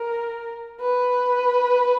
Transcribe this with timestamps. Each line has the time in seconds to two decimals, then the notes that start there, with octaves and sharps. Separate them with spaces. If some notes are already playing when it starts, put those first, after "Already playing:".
Already playing: A#4
0.81 B4